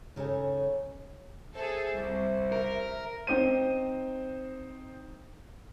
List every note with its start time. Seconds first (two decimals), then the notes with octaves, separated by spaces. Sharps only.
0.16 C#3 D#4 A4 C#5 G#5
1.56 G#4 A4 C5 E5
1.93 C2 E5
2.52 A#4
3.27 C4 D#4 C5 D#7